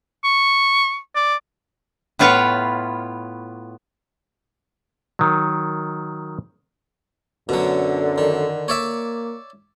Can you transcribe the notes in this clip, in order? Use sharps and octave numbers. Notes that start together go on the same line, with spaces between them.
C#6
D5
A2 B3 F4 C#5 F5
D#3 F#3
F#2 B2 D3 F#3
D#3
A#3 C#5 D5 E5